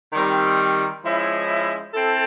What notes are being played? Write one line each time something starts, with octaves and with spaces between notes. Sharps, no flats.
D#3 G3 C4
F3 G#3 C#4 E4
C4 E4 A4